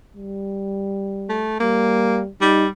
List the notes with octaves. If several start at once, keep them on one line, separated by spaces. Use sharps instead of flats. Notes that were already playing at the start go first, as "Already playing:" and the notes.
G3
A3
G3 A#3
G3 D#4